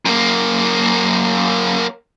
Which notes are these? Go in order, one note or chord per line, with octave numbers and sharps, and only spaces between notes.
F#2 A#3